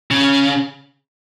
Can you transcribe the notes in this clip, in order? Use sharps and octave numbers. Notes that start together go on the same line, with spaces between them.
C#3